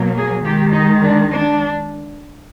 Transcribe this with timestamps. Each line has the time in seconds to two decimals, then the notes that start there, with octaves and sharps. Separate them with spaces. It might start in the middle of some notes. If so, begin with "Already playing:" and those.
Already playing: B2 F#3 A#3
0.17 G#4
0.45 D#3 G#3 G4
0.73 D#4
1.02 D4
1.31 D4